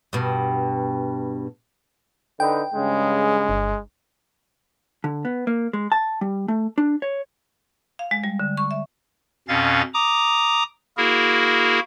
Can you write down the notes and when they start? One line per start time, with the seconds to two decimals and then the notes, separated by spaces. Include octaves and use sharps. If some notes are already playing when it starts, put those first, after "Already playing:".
0.13 G2 B2
2.40 D3 D#4 B4 G5
2.74 G2 C#3 G#3
3.49 G1
5.04 D3
5.25 B3
5.47 A#3
5.73 G#3
5.92 A5
6.21 G3
6.48 A3
6.78 D4
7.02 C#5
7.99 F5
8.11 G#3
8.24 G3
8.40 D3
8.57 C#6
8.71 E5
9.48 F2 B2 C#4 F5 A6
9.94 A#5 D6 D#6
10.97 A#3 E4 F#4 G#4 A#4